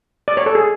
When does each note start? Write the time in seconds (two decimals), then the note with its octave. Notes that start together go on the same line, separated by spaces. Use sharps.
0.28 D5
0.37 C#5
0.46 A4
0.55 G#4